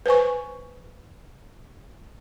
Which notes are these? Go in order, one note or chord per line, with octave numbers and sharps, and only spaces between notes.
B4 C5 G#5 C#6